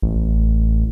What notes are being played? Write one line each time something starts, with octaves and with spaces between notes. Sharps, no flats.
A1